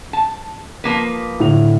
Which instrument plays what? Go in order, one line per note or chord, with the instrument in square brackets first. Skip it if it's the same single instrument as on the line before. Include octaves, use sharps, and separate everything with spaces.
[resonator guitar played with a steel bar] A5
F3 A#3 B4
[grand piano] A2 D3 F7